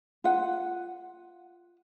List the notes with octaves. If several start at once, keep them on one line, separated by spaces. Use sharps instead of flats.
F4 F#5